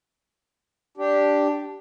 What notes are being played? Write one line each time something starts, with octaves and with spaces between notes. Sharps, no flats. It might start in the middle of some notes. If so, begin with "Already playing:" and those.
D4 G4